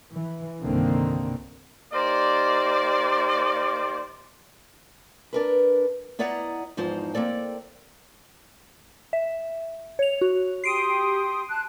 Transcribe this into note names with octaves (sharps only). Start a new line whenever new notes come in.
E3
C2 G2 D3 D#3 A#3 C4
A#3 D#4 G4 C5 D5
D4 A#4 B4
B3 E4 D5 D#5 F#5 A#5
E2 G#2 F3 D#4 C5
A#3 C4 A4 D5 G5
E5
C#5 F7
F#4
G4 C6 D#6 C7 D7 D#7
A5 F#6